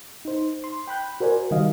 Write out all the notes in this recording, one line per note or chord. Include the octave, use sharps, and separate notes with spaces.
D#4 C5
C6
G5 B5 F#6 G6
F#4 A#4 C5 D5 G#5
D#3 G3 D#5 F5